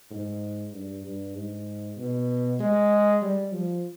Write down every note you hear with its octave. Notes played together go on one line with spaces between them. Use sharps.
G#2
G2
G2
G#2
B2
G#3
G3
F3